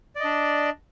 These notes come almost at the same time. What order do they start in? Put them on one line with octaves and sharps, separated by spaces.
D5 D#5 D4